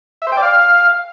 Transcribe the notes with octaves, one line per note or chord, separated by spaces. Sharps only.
E5
C5
G5
D5
F5